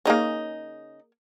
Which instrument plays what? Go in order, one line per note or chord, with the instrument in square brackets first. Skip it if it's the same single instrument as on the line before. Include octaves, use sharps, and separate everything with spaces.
[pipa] C#3 D#4 [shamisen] A#3 G#4 C#5